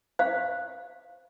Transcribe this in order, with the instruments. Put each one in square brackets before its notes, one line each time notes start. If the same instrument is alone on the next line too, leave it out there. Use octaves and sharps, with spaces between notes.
[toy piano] C5 F5